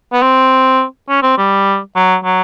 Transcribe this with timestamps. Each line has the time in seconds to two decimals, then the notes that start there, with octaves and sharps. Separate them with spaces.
0.13 B3
0.22 C4
1.09 C#4
1.23 C4
1.38 G3
1.96 F#3
2.25 F#3